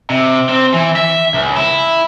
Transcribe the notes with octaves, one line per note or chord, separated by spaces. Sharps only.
C3
C4
E3
E5
C#2
E4